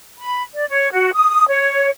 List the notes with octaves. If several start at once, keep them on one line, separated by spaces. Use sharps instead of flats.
B5
D5
C#5
F#4
D#6
C#5